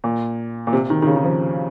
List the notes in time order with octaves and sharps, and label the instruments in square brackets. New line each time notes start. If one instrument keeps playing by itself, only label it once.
[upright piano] A#2
A#2
C3
D#3
D#3
C#3
D#3
F3